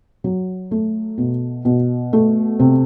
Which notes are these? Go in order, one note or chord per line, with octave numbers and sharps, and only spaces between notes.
F#3
A3
B2
B2
A3
C3